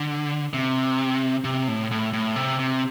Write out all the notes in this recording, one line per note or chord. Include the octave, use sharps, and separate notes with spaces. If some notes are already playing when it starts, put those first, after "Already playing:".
Already playing: D3
C3
C3
A2
A2
A2
C3
C3